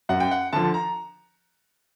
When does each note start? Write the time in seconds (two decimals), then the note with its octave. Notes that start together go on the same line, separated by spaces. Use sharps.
0.09 F#2 F#5
0.20 G5
0.31 F#5
0.53 D3 F3 A5
0.74 A#5